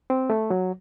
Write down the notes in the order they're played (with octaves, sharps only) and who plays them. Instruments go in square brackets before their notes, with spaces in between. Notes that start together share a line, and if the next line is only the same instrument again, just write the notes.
[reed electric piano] C4
A3
F#3